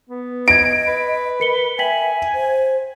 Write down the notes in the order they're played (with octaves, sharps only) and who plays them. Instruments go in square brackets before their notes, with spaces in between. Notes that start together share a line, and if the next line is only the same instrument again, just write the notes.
[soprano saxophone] B3
[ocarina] D#5 [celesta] G#6 A#6 [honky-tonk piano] D7
[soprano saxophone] B4
[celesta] A#4 C#7 G7
[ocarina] E5 [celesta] G5 B6 F#7 [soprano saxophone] G#5
[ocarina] C5